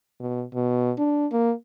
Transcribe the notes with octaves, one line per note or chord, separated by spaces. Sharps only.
B2
B2
D4
A#3